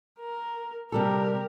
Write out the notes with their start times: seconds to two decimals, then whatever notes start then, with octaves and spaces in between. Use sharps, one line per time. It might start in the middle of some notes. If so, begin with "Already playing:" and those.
0.20 A#4
0.92 C3 G3 G4 A4 A#4